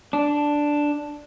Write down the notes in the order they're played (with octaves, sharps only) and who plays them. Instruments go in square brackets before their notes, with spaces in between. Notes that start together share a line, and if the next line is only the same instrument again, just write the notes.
[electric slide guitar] D4